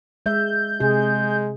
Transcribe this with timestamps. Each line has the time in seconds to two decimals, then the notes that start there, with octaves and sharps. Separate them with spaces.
0.26 G#3 E5 G6
0.80 C3 G#3 G#4